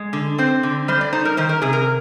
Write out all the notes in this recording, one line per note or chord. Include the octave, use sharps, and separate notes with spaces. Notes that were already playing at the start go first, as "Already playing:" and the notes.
Already playing: G#3
D3
C4 C5
D3
G3 C5
D5
D#4 C5
A#4
D#3 C5
A#4
C3 G#4
A#4